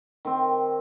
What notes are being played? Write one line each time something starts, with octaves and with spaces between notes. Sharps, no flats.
D#3 C4